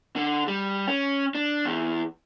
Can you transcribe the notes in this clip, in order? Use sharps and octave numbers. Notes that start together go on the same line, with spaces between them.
D3
G3
C#4
D4
E2